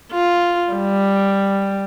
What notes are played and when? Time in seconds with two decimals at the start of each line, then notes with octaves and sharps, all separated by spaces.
0.12 F4
0.73 G3